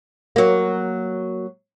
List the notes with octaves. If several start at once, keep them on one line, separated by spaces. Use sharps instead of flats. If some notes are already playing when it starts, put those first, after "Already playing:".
F#3 A#3